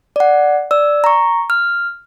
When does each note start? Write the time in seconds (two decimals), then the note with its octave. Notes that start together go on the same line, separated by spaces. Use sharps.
0.16 D5 F#5
0.71 D5 E6
1.04 A#5 C#6
1.50 F6